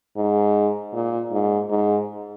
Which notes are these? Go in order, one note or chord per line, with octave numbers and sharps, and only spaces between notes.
G#2
A#2
G#2
G#2